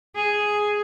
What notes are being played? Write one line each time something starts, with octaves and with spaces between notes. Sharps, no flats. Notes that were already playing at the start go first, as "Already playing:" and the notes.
G#4